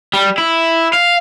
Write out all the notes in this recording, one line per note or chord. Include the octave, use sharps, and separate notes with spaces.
G3
E4
F5